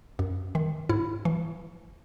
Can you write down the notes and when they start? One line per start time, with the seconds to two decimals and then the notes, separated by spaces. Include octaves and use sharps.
0.19 F#2
0.55 D#3
0.89 G#2 E4
1.25 E3